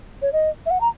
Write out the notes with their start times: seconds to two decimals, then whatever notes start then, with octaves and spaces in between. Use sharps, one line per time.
0.22 C#5
0.32 D#5
0.66 E5
0.70 F#5
0.81 A#5